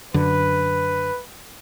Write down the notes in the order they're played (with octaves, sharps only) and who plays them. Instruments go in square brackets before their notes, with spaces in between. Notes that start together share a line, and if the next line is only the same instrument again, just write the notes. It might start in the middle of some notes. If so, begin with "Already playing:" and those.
[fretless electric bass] F#2 D3 [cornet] B4